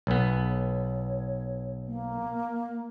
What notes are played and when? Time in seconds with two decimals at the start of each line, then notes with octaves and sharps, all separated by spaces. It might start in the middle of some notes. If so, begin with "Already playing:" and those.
0.07 B1 B3
0.49 C#5
1.87 A#3